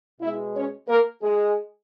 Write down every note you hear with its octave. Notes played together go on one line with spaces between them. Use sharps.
B2 G#3 E4 E5
C#4 C#5
A#3 A#4
G#3 G#4